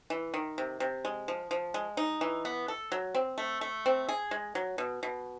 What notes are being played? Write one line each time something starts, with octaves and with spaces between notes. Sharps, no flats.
E3
D#3
C3
C3
G#3
F3
F3
G#3
D#4
E3
B3
A4
F#3
C4
A3
A3
C4
G#4
G#3
F#3
B2
B2